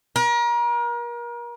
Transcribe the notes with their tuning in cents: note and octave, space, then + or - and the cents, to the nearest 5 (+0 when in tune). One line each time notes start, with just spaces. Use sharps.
A#4 +35